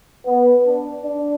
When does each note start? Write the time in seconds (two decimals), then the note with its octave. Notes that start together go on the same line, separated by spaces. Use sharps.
0.26 B3
0.66 D4
1.04 D4